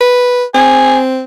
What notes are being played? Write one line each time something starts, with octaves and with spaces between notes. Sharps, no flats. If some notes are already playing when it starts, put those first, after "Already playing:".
B4
C4 G#4